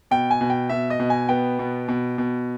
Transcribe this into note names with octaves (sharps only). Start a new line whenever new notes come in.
B2 G5
G#5
B2
G5
B2 E5
D#5
B2
G#5
B3 G5
B2
B2
B2